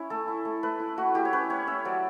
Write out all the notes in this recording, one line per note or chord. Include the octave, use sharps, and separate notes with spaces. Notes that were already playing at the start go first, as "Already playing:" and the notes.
Already playing: C#4 E4
A3 A4
E4
A3
A3 B4
E4
A3 F#4
E4 G4
C#5
C#4 B4
C#4 C#5
C#4 E5
F#3 D5